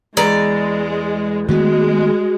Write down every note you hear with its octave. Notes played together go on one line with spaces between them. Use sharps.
E2 G#3 D5 A#5
D#3 G#3 A3 B3 F#4